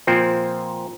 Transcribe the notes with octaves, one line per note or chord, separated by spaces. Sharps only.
A#2 F3 C4